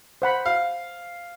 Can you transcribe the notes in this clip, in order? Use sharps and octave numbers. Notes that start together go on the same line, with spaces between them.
C5 F#5 B5
F5